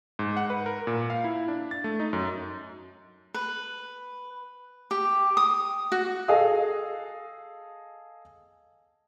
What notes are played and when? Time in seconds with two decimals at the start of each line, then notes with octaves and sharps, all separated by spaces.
0.19 G#2
0.37 F#5
0.50 B4
0.66 A#4
0.87 A#2
1.10 F5
1.24 E4
1.48 D4
1.71 A6
1.84 A3
2.00 D#4
2.13 F#2
3.34 B4
4.91 G4
5.37 D#6
5.92 F#4
6.28 G#4 A4 D#5 F5 D#6